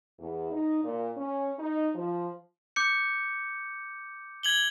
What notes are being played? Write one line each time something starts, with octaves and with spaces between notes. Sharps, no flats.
E2
D#4
A#2
C#4
D#4
F3
D6 G6 C#7
G#6 F#7 G7